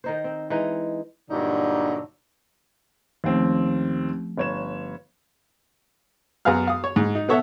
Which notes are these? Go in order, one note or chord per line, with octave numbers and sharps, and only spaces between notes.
D#3 D#4 C5
C4
E3 G#3 D#4
G2 A#2 D3 F#3 D#4
D#2 F3 A3 C4 C#4
G1 C#5 E7
F#2 B3 G#4 F5 F6
F5 D#6
C#5
G#2
D#4
B2 B3 A4 C#5 E5 F#5